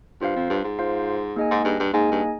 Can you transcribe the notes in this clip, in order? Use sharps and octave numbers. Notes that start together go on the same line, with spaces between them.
G2 F4 C5 F5
F2
G2
G#2
F4 C5 F5
A#3 D#4 G#4 D#5 G#5
G#2
G2
G2
G#2 A#3 D#4 G#4 D#5 G#5
G2